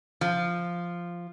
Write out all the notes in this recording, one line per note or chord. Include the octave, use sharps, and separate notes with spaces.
F3